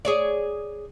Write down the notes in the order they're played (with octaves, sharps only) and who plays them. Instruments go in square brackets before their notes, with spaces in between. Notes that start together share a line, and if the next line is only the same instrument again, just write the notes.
[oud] G#4 C#5 D5